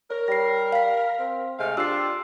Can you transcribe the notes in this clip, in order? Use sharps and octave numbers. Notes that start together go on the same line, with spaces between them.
A#4 C#5
G3 A#6 C7
F5 B6
C4
C3 G#3 A3 F5
D4 F4 G4 E6 C7